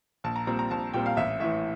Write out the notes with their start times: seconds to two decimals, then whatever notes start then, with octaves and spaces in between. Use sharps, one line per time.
0.24 A#1 A5
0.36 A#5
0.47 A#2 G3 C4 A#5
0.59 A#5
0.71 A#1 A5
0.94 A#2 G3 C4 G5
1.06 F5
1.17 A1 E5
1.40 A2 E3 E5